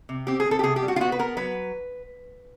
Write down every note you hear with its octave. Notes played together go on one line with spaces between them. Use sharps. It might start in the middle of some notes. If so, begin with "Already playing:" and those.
C3
C4 G4
G#4
C4
A4
G4
C3 G#4
G4
G3
F#4
F4
B3 F#4
B4
B3 A#4
F#3 B4